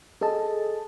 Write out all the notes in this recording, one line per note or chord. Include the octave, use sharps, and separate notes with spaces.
G#4 A4 D#5 A5